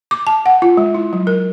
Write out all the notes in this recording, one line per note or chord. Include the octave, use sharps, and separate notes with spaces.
D6
A5
F#5
F4
G#3
E4
F#3
A#4